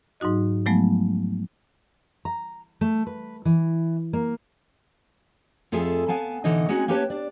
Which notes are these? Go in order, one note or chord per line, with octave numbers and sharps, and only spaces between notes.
G#2 F#3 D#4 F#4 D#5
F3 F#3 G#3 A3 B3
A#5
A3
B4
E3
A#3
F2 F4 G#4 A4 E5 G#5
B3 F5 G#5 A5
B2 D3 E3 D#4 D#5
G#3 C4 C#4 D#4 F#4 G#4
A#3 C#4 G4 B4 C#5 A5
D4 D5